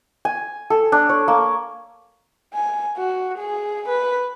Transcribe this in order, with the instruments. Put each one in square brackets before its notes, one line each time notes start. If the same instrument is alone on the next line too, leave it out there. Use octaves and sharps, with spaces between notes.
[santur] G#5
A4
D4
C#5
A#3
[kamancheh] G#5
F#4
G#4
B4